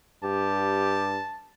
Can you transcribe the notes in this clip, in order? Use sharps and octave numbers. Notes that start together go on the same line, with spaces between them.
G2 G4 A5